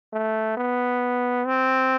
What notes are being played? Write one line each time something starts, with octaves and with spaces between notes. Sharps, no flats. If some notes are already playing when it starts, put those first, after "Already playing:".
A3
B3
C4